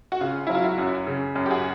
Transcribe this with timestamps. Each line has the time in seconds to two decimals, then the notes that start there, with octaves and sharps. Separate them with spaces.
0.12 F#4
0.20 C#3 F4
0.47 F#3 E4
0.55 F4
0.64 E4 F#4
0.78 F#2
1.07 C#3
1.35 F#2
1.46 G4
1.51 F#4 G#4